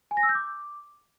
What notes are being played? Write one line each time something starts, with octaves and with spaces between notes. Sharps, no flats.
G#5
A#6
E6
G6
D6